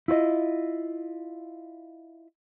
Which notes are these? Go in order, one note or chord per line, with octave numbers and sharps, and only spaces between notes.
E4 F4 C5 D#5